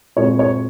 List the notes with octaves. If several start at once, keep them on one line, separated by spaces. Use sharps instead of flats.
A#2 G#3 C4 C#5
C#5